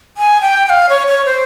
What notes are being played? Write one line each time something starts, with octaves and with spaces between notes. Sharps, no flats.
G#5
G5
G5
F5
C#5
C#5
C5